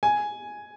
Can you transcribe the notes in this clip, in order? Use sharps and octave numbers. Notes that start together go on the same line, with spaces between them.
G#5